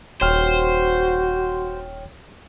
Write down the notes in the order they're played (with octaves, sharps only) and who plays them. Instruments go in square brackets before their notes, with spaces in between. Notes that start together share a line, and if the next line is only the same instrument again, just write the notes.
[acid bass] D#1 [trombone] F#4 [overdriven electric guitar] C5 [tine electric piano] C#5 G5 F6